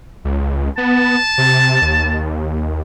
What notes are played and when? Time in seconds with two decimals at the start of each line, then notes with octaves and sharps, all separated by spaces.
0.25 C#2
0.78 B3 A5
1.38 C3
1.82 D#2